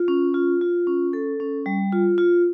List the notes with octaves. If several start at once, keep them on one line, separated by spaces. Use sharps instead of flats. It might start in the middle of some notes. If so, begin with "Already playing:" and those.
Already playing: F4
C#4
F4
F4
C#4
A4
C#4
G3
F4
F4